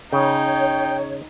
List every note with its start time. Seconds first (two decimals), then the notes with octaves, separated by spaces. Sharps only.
0.13 C#3 D#4 C#5 G5